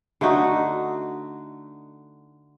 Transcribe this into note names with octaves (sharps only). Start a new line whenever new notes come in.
D3 A3 D#4 F#4